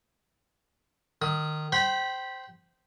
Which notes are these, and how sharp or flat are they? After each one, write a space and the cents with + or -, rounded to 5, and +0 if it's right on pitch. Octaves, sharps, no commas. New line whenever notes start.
D#3 -20 D#6 +30
C5 +0 G5 -25 B5 -15